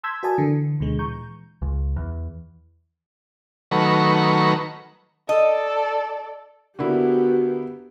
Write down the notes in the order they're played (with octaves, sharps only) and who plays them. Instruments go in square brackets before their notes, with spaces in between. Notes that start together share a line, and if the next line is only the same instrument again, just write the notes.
[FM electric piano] A5 C6 E6 G6 G#6 B6
F#4 A#4 D5 G#5 A5 D#6
D3 E3
D2 B2 D3 G#3
A#2 E3 A#5 C#6 G6
[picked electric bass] C#2
E2
[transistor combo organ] D#3 F#3 A3 B4 A#5 C#6
[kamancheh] A4 D5 [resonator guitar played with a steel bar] D#5
[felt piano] D3 A#3 E4 [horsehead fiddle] B3 G4 [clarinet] F#4